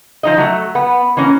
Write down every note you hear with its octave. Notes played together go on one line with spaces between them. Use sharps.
F3 D#4 D#5
F#3 A3
B3
E3 A#3 C#4